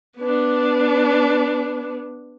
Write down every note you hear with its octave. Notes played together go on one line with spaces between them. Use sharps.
B3 D4